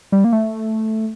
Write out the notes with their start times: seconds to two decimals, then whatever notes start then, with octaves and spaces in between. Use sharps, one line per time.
0.12 G3
0.24 A#3
0.32 A3